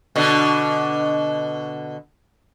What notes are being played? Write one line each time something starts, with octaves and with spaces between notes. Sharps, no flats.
B2 D3